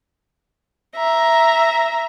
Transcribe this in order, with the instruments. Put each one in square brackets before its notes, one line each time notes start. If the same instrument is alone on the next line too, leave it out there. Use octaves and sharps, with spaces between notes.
[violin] E5 A#5